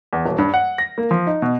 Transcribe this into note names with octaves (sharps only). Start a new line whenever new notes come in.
E2
D#1
G2
F#5
A#6
A#3
F3
D#4
B2